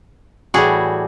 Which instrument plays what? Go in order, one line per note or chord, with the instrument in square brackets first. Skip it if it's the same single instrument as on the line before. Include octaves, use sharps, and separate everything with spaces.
[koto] A2 E3 G3 F#4 G#4